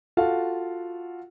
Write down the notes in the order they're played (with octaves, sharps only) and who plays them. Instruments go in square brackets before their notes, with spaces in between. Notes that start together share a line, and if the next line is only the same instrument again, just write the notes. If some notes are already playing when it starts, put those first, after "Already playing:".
[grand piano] F4 F#4 A4 F5